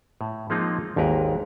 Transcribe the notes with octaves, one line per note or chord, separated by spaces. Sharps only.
A2
F3 G#3 A#3 C4 D#4 F4
G#1 D#2 G#2 A#4 B4